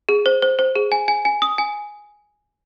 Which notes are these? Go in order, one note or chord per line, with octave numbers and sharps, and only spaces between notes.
G#4
C5
C5
C5
G#4
G#5
G#5
G#5
D#6
G#5